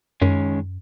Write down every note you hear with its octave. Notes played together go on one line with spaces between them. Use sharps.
F#2 D#3 G#3 C#4